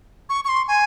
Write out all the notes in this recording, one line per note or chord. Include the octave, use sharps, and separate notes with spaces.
C#6
C#6
C6
G#5